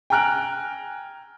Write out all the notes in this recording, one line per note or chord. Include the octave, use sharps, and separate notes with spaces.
G5 G#5 A#5 F6 F#6 D7